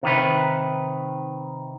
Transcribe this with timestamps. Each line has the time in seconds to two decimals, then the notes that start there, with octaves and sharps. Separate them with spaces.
0.03 C3 D#3 B4